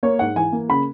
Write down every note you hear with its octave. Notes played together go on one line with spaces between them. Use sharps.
A#3 C#5
G#2 F#5
E3 G#5
A#3
C#3 B5